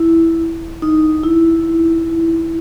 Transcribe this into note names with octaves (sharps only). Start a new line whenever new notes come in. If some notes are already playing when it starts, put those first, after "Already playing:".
Already playing: E4
D#4
E4